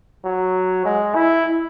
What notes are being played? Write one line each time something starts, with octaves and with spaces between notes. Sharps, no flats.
F#3
G#3
E4